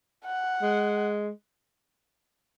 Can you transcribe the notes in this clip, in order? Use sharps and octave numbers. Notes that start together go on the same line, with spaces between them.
F#5
G#3